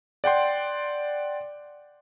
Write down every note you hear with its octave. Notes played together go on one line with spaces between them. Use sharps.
D5 F#5 G5 C6